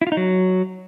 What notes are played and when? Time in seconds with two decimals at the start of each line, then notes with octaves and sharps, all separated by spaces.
0.01 E4
0.07 F4
0.12 D#4
0.17 F#3